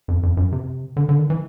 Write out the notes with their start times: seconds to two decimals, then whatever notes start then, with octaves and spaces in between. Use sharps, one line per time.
0.08 F2
0.23 F2
0.37 F#2
0.52 C3
0.97 D3
1.09 D3
1.19 D#3
1.30 E3